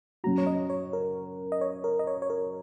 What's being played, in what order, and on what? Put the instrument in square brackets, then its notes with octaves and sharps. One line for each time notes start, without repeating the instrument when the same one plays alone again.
[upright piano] F#2 F#3 C#4 F#4 [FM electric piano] A#5
[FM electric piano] C#5
D#5
C#5
A#4
D#5
C#5
A#4
D#5
C#5
C#5
A#4